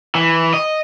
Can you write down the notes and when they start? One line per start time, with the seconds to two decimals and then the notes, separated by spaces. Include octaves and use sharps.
0.15 E3
0.53 D#5